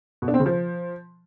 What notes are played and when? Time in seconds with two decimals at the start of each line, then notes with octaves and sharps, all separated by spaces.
0.22 B2
0.28 D4
0.34 C4
0.40 C#3
0.46 F3